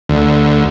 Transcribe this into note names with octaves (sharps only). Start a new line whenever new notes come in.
D2